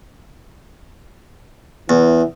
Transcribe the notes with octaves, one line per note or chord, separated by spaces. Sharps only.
E2 E3